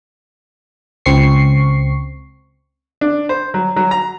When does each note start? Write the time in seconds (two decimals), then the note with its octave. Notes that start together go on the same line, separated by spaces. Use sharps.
1.06 C#2 C4 C#6 C7
3.01 D4
3.29 C5
3.54 F#3
3.76 F#3
3.91 A#5